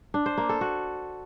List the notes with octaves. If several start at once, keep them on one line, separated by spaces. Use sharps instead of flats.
D4
C5
A#3
A4
F#4